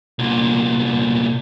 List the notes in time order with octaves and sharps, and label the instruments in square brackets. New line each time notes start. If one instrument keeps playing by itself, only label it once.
[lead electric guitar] C2 A#2